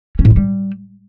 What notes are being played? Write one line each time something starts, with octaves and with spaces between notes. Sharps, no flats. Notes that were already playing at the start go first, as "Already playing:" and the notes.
C#4
A2
G#3
G3